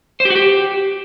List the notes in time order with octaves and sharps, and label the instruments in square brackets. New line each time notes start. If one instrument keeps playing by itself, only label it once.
[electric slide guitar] C5
G4
F#4
G4